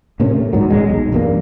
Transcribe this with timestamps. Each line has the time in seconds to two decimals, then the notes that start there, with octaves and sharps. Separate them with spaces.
0.20 A2 C3 A#3 C#4
0.36 A3
0.53 D#1 G#2 F#3
0.70 D#1 G#3
0.89 B1
1.12 E1 G2 A#3